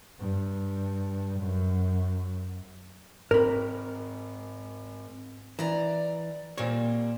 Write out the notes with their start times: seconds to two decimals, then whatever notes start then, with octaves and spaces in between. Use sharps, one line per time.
0.20 G2
1.40 F#2
3.31 G#2 C4 A#4 B5
5.59 E3 D5 A#5
6.58 A#2 G3 A#3 C4 C#5